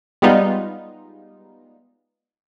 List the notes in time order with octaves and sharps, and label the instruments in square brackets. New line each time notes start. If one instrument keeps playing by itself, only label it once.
[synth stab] G3 G#3 B3 D#4 F4